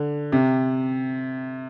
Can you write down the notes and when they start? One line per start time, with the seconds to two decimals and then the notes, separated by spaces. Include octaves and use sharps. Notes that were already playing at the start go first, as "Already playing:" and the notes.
Already playing: D3
0.32 C3